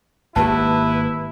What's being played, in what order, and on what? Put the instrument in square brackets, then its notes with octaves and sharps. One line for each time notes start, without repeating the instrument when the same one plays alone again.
[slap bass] G#1 A#3 [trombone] E4 [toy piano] G4 A5 [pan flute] B4